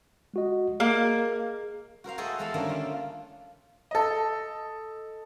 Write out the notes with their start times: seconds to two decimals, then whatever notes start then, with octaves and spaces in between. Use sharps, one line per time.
0.34 G#3 F#4 D#5
0.80 A#3 G#4 D#5
2.04 F#4 A#4 C5 F5
2.18 A3 F#4 G#4 A4 C5 D#5
2.39 E2 G#3 A4 F5 A5 B5
2.54 D3 D#3 G3 A3 A#3 C#4
2.69 F4
3.91 A4 D#5